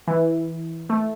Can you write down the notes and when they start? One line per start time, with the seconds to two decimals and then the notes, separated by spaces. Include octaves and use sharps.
0.07 E3
0.89 A3